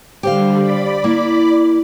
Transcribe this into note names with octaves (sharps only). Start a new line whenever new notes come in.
D3 G3 G4 C5 F5
D5 B5 D6
A#3 E4